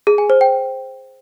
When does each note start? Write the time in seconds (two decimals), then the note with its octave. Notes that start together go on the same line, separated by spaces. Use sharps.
0.07 G#4
0.18 G#5
0.30 C5
0.41 G5